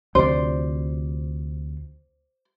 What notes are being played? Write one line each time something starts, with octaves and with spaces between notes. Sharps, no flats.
D2 C3 F3 C5 D5